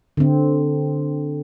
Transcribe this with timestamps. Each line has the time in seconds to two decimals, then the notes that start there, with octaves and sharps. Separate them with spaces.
0.17 D3 C4